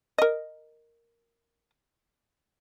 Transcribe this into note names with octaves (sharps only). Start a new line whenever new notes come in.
A#4 D#5